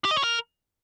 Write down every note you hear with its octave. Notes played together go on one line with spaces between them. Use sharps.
G4
D#5
C#5
A#4